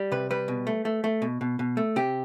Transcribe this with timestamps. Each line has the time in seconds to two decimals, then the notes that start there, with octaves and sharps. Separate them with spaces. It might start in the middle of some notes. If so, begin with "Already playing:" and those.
Already playing: G3
0.12 C3 B4
0.30 G3 B4
0.48 B2
0.67 A3
0.85 A3
1.04 A3
1.22 B2
1.41 B2
1.59 B2
1.77 A3
1.96 C3 G4